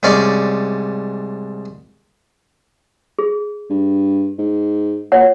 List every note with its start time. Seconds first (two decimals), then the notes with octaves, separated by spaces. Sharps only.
0.03 C2 G#2 C#4 D5 F5 C6
3.19 G#4
3.70 G2
4.39 G#2
5.12 A#2 C#5 F#5